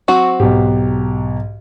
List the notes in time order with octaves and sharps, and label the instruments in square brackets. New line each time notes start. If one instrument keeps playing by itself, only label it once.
[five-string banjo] F#3 C4 F#4 [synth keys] C#6
[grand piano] B1 G4 [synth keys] G#2